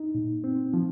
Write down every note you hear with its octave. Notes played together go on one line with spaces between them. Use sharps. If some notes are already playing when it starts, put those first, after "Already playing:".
Already playing: D#4
A#2
C4
F3